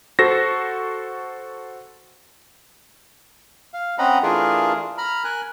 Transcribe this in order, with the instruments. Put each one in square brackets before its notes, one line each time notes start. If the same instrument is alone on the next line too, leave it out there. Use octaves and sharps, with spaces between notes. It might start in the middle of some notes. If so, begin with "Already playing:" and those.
[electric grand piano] F#4 A4 C5 A#6
[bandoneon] F5
C4 C#4 D#5 F#5 A#5 B5
E3 A3 D4 F4 G#4 A#4
A#5 B5 F6
A#4 G#5 F#6